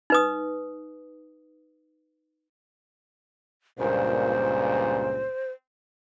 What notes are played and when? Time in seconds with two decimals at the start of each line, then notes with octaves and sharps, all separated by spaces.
0.10 D#4 B4 D#6
3.79 C#2 G2 A#2 C5